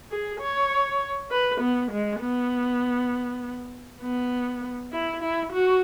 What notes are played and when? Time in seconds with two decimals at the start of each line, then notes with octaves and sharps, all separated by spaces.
0.11 G#4
0.40 C#5
1.31 B4
1.61 B3
1.91 G#3
2.20 B3
4.02 B3
4.92 E4
5.22 E4
5.53 F#4